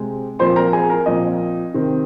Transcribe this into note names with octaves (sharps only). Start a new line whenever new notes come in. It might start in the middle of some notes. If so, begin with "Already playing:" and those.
Already playing: C3 G#3 C4
A#2 F3 C4 C5 C6
A#4 A#5
G#4 G#5
A#4 A#5
A#2 F3 C4 D#5
C3 D#3 C4